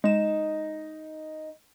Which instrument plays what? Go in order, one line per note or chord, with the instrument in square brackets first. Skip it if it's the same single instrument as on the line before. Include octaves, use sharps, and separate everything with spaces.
[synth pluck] G#3 E7 [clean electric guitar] D#4